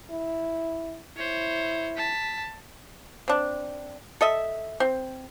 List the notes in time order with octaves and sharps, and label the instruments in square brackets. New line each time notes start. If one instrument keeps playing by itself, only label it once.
[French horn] E4
[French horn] E4 [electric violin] C5 C#5
[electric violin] A5 B6
[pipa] C4 D4
A4 D#5 E5
C4